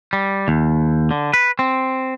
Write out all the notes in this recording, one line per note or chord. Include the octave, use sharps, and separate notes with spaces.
G3
D#2
D3
B4
C4